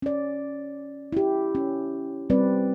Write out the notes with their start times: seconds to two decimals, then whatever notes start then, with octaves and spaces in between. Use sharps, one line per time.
0.02 C#4 D5
1.13 E4 G4
1.55 C#4
2.30 G3 C4 B4 D5